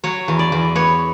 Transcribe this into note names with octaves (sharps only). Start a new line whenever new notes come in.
F#3 C#5
E2
D5
E2
B3 C#5